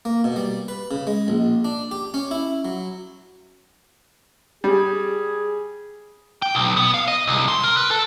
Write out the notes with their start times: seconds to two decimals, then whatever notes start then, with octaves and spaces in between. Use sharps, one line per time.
0.05 A#3
0.24 B2
0.36 G3
0.68 B4
0.91 C#3
1.07 G#3
1.28 A#1
1.65 D4
1.91 G4
2.14 C#4
2.31 E4
2.65 F#3
4.64 G3 G#4
6.42 G5
6.55 B1
6.77 B3
6.94 F5
7.08 D#5
7.28 C2
7.48 C6
7.63 A#4
7.77 B4
7.91 A4